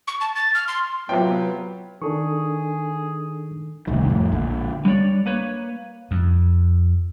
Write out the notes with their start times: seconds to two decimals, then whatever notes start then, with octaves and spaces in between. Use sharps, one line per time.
0.07 C#6
0.21 A5
0.35 A6
0.55 F6
0.68 C6
1.09 A2 C3 F#3 B3 F4 G5
2.02 D#3 D4 G#4 A4 C#6
3.87 D#1 C2 A2 D#3
4.09 F2 A2
4.32 A#1 D3
4.85 G3 D4 C#5 D5
5.26 A#3 B4 C#5
6.11 F2